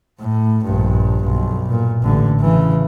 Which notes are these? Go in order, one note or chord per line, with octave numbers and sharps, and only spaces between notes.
A2
A#1 G2
B1
A#2
A1 D3
C#3 E3